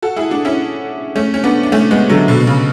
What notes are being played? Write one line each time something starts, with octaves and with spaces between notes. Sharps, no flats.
F#4 A4
E4 G#4
D4 F#4
C#4 E4
A3 C#4
C#4
B3 D4
D4
A3 C#4
G#3 B3
D3 F#3
B2 D3
B2
C#3